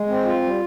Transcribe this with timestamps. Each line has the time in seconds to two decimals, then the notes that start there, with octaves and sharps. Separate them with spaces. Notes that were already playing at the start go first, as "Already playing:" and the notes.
Already playing: G#3
0.08 C4
0.25 F4
0.43 G3